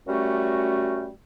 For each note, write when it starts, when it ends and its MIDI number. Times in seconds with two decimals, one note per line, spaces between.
0.07 1.10 42
0.07 1.10 55
0.07 1.10 57
0.07 1.10 61
0.07 1.10 66